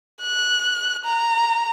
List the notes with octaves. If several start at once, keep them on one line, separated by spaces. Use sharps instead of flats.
F#6
A#5